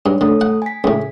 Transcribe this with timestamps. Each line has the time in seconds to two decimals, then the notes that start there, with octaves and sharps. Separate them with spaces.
0.06 G2 C#5
0.21 D3 A3 A4 D#6
0.41 F#5
0.62 G#5 B6
0.84 C#2 A2